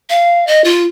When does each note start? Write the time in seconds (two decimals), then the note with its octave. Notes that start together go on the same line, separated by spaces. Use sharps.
0.09 F5
0.47 D#5
0.64 F4